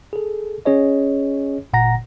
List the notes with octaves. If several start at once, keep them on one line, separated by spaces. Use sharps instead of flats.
G#4 A4
C#4 G#4 C#5 D#5
G1 A#2 F#5 A#5 A#6